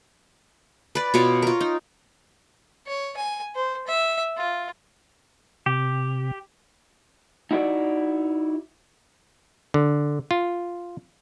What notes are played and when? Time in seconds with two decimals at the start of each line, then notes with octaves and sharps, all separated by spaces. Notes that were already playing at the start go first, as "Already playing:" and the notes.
0.95 B4 D5
1.14 B2 F4 C#5 D6
1.42 F4 A#4
1.61 D#4
2.87 C#5
3.17 G#5
3.55 C5
3.87 E5
4.37 F4
5.66 C3 G4
7.51 D#4 E4 F#4 B4 D5
9.74 D3
10.31 F4